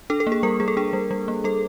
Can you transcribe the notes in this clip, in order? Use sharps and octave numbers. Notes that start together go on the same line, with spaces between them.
D4 A4
A4
A#3
G#4
G3 A#4
G3 G#4
A4
D4 G#4
G3
G3
A#3
G3 A4